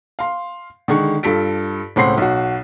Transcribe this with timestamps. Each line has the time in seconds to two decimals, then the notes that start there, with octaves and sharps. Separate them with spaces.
0.19 F5 C6
0.88 D3 D#3 G#3 C#6
1.23 G2 F4 A4 B6 D7
1.96 C#2 A2 C4 F#5 C6 C7
2.17 B1 F#4